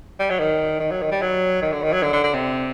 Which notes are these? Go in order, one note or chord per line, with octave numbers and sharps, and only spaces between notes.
G3
F#3
D#3
D#3
F#3
D#3
G3
F#3
D#3
D3
D#3
F#3
D3
D3
D3
C3